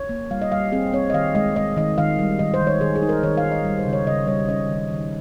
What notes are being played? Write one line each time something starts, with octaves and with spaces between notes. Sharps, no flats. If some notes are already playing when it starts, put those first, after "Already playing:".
Already playing: C#5
A#3
G3 F5
D#5
G3 F5
C4 G#4
C4 C#5
D#5
D#3 F5
G#3 D#5
G#3 D#5
D#3 D#5
D#3 F5
G3
D#3 D#5
C5
D#3
C#5
D#3 G#4
G#4
D#4
A#4
D#3 C#5
F5
D#3
D#5
G3
C5
C#3
C#5
C#3 D#5
G3 C#5
C#4 D#5
D#3
D#3